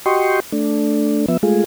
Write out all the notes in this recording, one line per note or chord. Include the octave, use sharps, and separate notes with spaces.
F#4 G4 D#5 G5 C6 C#6
A3 D4
F3 B3 E5
G#3 A3 F4 G#4